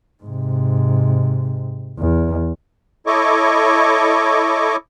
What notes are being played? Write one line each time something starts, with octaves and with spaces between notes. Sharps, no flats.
G#2 C3
E2
E4 A4 C#5 D#5 C#6 D6